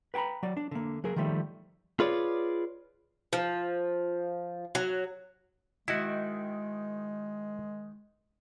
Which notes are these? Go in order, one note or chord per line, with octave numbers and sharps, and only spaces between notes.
B4 G5 G#5 A#5 B5
F#3 D5
D4
D3 A#3
F#3 G#4 A#4
D#3 F3 G3 A3
F4 G#4 B4 C#5 D5
F3
F#3
D#3 G#3 E4 F#4